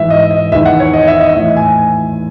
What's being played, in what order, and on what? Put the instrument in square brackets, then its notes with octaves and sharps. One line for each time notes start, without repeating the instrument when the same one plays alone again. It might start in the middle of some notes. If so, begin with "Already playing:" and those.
Already playing: [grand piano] G#2 E3 E5
D#5
D#5
E2 E5
D#3
F#5
C#5
D#5
E5
D#5
A2 E3 E5
G#5